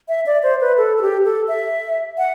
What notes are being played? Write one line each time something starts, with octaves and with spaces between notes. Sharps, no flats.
E5
D5
C5
B4
A4
A4
G4
A4
E5
F#5